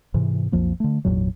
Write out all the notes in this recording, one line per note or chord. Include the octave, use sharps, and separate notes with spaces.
G#2 C3 E3
B1 F2 F3 A#3
D3 A3
G#1 E2 A#2 F#3